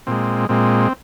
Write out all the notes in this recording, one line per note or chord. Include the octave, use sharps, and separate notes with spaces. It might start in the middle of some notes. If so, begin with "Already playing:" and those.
A#2 G#3 C4
A#2 G#3 C4